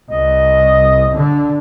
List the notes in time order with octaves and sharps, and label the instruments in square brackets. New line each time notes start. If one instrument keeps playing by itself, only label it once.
[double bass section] C2 [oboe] D#5
[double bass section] D3